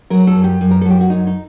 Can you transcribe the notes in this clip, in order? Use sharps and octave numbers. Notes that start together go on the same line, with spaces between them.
F#3 A#4
A4
F#2
G4
F#2
A#4
A4
F#3
G4
F#4
F#2 D#4
D#4